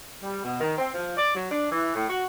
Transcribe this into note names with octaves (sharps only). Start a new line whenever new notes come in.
G3
B2
D#3
C4
F3
D5
F#3
D4
E3
A2
F#4